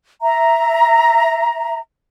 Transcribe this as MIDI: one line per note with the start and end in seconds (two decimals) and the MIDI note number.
0.22 1.78 76
0.22 1.78 82